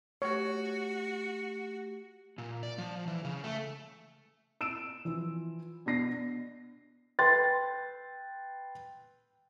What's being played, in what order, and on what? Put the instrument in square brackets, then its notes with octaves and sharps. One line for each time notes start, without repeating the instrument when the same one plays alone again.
[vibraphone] A3 G4 [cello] F#4 [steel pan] C#5
[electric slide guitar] A#2
D5
F3
E3
C#3
A3
[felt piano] E6 D7 E7
E3 F3
B2 D4 A#6 C7
B4 G5 C6 A6